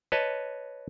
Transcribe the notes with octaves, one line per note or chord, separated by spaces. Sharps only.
B4 C#5 D#5 A5